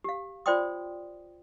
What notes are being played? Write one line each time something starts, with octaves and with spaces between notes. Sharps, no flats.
G4 F5
F4 C5 D5 G5 C6 D#6